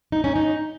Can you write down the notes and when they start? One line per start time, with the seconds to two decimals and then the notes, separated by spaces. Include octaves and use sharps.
0.12 D#4
0.24 C#4
0.36 D#4